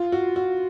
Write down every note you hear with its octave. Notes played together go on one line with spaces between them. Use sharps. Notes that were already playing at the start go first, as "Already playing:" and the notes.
Already playing: F4
F#4
F#4